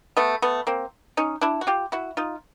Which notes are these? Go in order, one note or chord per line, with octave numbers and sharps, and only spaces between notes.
A3 B3
A3 B3
A#3 C4
C#4 D#4
D4 E4
F#4
F4 G4
E4 F#4
D#4 F4